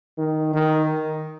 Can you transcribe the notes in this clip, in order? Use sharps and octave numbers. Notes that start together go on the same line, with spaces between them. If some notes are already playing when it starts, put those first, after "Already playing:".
D#3
D#3